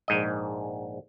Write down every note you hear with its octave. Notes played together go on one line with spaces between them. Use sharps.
A#1 G#2 D#5